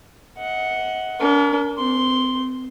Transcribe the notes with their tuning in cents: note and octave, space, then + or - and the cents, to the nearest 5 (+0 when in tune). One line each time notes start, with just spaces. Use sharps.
D#5 +35 F#5 +0
D4 -45 A#4 +0
C4 -30 C6 +0